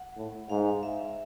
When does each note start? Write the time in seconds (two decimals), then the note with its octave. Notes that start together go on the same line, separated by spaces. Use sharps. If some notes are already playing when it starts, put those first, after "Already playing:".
Already playing: F#5
0.17 A2
0.49 G#2 F5
0.83 E5